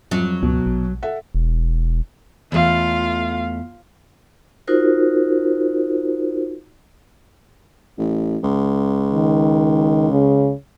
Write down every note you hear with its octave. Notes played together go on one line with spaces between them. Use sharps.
F2 F#3
C#2 B2
A#1
A4 E5 F#5
E1
E2 A3 F4 F5
D#4 F4 F#4 A#4 C5
A1
C#2
D#3
C#3